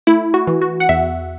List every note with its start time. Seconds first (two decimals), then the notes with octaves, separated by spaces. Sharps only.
0.07 A3 E4
0.34 F#4
0.47 E3
0.62 F#4
0.80 F#5
0.89 E2 E5